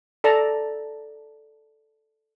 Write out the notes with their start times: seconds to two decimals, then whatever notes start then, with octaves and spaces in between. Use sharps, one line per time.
0.24 A4 D5 A5 A#5